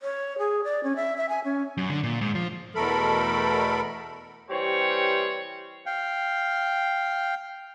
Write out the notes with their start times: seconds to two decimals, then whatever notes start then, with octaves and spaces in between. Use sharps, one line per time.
0.01 C#5
0.38 G#4
0.64 D5
0.84 C#4
0.96 E5
1.17 E5
1.29 G#5
1.44 C#4
1.77 F#2
1.90 D3
2.03 A#2
2.21 G#2
2.35 F3
2.75 E2 B2 A3 A4 A#4 B5
4.50 E3 G3 C4 G4 C#5
5.86 F5 G5